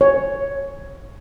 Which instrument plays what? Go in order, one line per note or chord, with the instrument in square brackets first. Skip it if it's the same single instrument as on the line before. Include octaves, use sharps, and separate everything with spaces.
[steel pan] C#5